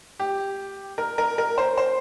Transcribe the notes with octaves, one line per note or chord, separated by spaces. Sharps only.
G4
A#4
A#4
A#4
C5
C5